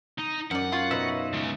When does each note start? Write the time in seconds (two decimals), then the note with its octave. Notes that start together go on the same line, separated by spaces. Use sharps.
0.18 D#4
0.51 F#2 D5 F#5
0.72 F4 C#5 F5
0.91 B2 D#4 E5
1.33 C#2 C#3